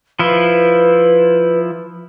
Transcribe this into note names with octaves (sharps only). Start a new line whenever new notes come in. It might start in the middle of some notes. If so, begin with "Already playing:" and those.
F3 E4 B4